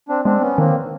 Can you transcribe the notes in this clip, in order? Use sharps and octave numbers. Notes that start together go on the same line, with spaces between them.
C4 D4
G#3 B3 C4 D4
B3 C#4
D#3 A#3 C4